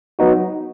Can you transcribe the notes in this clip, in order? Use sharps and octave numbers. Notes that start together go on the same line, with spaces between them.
F#3 B3 D#4 F#4